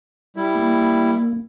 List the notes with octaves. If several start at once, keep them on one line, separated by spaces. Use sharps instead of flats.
G3 E4
A#3